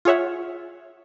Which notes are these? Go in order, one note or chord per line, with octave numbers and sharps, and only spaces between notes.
F4 G#4 C#5 E5 F#5